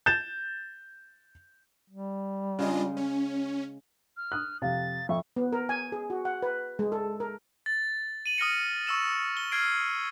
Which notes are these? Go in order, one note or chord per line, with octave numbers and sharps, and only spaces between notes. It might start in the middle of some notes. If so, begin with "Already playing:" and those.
G6 A6 E7
G3
C#3 G#3 D4 F4 D#5
C#4
F6
D#6 F#6
F2 C3 F5 A6
F2 E5 C#6
B3
A#4
G#5
G#4
F#4
F#5
B4
G#3
A4
A#4
A6
D#7 F#7
D#6 F6 A#6 C#7
C#6 E6 E7
G7
F6 G#6 C7 D7